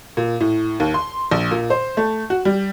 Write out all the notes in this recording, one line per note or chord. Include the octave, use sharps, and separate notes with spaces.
A#2
A2
D#2
C6
A#1
A#2
C5
A3
F#4
G3